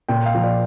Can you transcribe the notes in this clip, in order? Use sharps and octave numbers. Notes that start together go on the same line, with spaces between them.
A#2 G5
F5
F3
D5